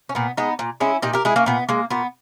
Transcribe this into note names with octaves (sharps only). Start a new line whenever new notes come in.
C#4
A#2 B3
G#3 B3 D#4
A#2
G#3 C#4 E4
A#2 D#4 G4
G4 A#4
G#3 E4 G#4
A#3 C#4
A#2 B3
G#3 A#3
A#2 B3